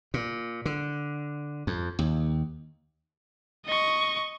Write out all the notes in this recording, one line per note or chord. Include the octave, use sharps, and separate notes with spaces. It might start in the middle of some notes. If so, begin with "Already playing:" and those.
A#2
D3
F2
D#2
D#5 C#6